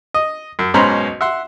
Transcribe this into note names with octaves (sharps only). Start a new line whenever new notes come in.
D#5
F#2
B1 G#2 C#4 C5 A#5 B5
E5 F#5 C6